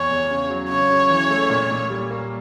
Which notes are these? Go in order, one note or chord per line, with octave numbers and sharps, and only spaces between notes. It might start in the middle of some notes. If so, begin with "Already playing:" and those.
Already playing: E2 C#5
E2
C#3
F#3
C#3 C#5
C#3
E3
A3
A#2
A#2
G3
A#3